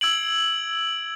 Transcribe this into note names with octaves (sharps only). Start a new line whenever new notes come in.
E6 G#6 D7 F#7